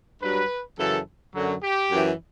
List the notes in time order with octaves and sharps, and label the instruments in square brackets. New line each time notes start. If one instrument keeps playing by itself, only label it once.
[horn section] G2 F#3 B4
F#2 C#3 E3 A4
F#2 D3 F#3
G4
F#2 E3